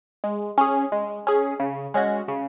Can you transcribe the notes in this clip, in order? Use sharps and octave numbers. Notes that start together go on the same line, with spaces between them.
G#3
C#4 G#4
G#3
C#4 G#4
C#3
G#3 C#4 F#4
C#3